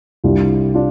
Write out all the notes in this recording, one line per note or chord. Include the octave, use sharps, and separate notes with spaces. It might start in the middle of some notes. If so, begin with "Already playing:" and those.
C2 C3 G3 D4 F4
D4 F4